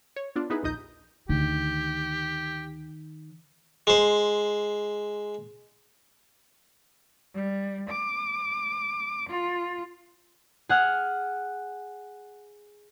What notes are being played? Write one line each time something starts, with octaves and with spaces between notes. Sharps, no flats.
C#5
B3 D4 F4
B3 D#4 E4 G#4 B4
A#1 D#2 D#4 D#5 G6
D2 D#3 G4
G#3 C5
G3
D6
F4
G#4 F#5 F6